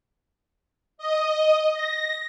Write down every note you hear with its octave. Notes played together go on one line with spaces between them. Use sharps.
D#5
A#6